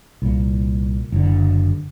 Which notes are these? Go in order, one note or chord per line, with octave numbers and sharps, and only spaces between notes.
C2 A#2
F#1 D3